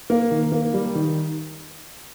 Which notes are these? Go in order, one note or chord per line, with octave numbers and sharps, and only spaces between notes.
A#3
D#3
A#3
G3
D#3